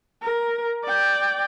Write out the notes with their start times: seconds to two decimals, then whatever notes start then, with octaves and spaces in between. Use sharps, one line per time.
0.22 A#4
0.84 D5 G5